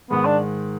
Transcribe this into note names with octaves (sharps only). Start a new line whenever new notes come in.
G#2 D#3 G#3 B3
D4